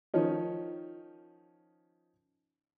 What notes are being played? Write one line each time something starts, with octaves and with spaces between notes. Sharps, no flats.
D#3 F3 C#4 D#4